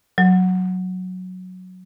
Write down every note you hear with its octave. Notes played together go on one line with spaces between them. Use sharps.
F#3